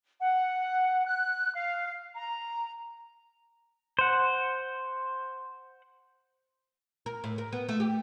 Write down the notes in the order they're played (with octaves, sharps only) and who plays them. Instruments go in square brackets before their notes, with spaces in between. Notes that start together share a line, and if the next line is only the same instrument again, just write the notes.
[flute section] F#5
F#6
F5
A#5
[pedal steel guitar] C5 F#5
[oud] A#4
A2
A#4
B3
A3
G4